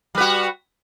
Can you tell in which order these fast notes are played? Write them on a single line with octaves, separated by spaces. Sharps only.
G3 B4 F#4